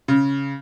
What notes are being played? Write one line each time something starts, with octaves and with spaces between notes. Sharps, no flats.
C#3